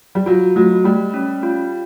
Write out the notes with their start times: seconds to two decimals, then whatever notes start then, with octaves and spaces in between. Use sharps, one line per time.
0.15 G3
0.26 F#3 F4
0.56 F#3 A3
0.85 G3 A3
1.14 C#4
1.43 F4